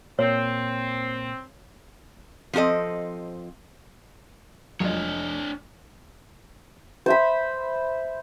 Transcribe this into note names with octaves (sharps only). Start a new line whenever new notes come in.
A#2 A#3 C4 C#5
F3 C4 F#4 A4 D#5
F1 F#3 G#3 D4 F4 C#5 D#5
C5 E5 B5